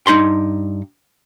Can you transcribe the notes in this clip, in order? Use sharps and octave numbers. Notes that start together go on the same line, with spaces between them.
G2 D#4 A#5 C6